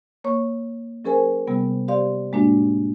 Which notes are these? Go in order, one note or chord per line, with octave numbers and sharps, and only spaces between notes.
A#3 C#5 C#6
F#3 C#4 G#4 A#4 C5 G#5
C3 G3 B3
G4 C5 D5 F5 C6
A2 G#3 A#3 D4 F#4